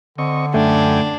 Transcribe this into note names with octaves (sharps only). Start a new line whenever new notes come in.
D3 C4 D#5 C#6
F#2 A3 D4 G5 G#5